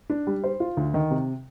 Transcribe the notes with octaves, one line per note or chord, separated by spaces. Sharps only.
D4
G3
C5
F4
D2
D#3
C3